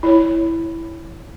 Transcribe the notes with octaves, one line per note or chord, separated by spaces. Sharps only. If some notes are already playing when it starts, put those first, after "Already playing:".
E4 C#5